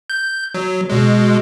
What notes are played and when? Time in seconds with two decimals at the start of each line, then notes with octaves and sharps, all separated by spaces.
0.10 G6
0.54 F#3
0.90 B2 G#3